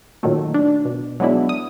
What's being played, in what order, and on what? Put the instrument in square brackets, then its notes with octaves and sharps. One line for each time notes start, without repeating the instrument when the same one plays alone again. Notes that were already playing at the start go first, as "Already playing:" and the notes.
[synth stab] A#2 D#3 F#3 A3
D4
B2
F#3 G#3 B3 D4 E4
D#6